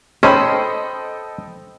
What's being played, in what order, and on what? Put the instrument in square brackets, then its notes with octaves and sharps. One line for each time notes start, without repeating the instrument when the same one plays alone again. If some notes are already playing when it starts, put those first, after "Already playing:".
[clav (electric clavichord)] C#4 [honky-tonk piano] A4 D#5 [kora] C5 [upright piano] G5 B5